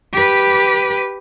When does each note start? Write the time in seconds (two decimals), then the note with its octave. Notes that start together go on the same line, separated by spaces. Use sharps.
0.13 G4 B4